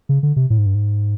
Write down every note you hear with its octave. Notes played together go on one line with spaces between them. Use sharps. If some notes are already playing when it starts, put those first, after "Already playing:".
C#3
D3
C3
A2
G#2
G2
G#2